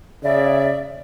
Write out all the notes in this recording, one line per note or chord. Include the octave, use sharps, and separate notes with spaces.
C#3 D5 E5